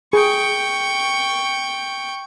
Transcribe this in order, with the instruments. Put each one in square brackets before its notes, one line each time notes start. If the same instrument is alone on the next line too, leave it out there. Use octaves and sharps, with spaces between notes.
[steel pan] G#4 [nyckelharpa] G5 C#6